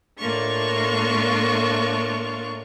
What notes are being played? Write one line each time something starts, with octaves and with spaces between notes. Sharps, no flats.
A2 A#3 D4 F4 C#6